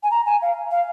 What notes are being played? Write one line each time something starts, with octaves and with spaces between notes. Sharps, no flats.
G#5
A#5
G#5
F5
F5